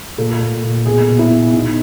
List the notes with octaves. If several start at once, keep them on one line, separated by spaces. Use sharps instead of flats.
A#2 A4
A#2
A#2
B2 G#4
B2
E4
B2
B2 D#4